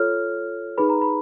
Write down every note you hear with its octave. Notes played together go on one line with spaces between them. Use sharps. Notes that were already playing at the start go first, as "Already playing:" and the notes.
Already playing: F4 A4 C#5 F6
D#4 G#4 B4 B5
A#5
B5